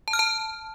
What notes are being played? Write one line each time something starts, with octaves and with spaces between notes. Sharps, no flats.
A5
F6
A5